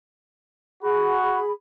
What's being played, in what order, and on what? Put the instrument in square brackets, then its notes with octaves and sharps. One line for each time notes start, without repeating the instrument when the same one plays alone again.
[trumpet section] F#4 [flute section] G#4 B5